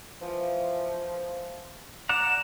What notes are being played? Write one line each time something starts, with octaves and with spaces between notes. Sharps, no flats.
E3 F3
D5 F#5 A#5 E7